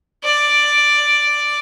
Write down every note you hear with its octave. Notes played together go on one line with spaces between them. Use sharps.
D5